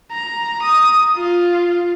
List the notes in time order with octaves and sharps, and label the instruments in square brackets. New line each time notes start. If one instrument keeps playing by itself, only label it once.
[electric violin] A#5
D#6
F4